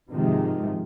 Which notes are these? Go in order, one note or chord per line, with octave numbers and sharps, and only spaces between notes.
G#2 C3 D#3 F3 G#3